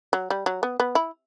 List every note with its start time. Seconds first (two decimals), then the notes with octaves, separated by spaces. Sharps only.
0.13 F#3
0.30 G3
0.46 F#3
0.63 B3
0.80 B3
0.95 E4